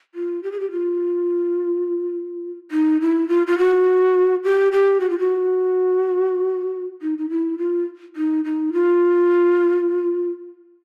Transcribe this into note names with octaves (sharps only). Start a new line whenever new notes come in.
F4
G4
G#4
G4
F4
D#4
E4
F4
F4
F#4
G4
G4
F#4
F4
F#4
D#4
D#4
E4
F4
D#4
D#4
F4